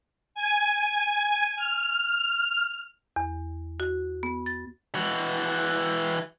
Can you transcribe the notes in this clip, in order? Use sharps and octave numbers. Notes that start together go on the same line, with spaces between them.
G#5
F6
E2
F#4
B3
A6
E3 F#4